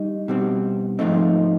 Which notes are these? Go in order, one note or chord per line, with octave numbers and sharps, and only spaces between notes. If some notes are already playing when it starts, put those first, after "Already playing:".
Already playing: G3 D#4
B2 G3 C4
G#2 F3 A3 C4 D#4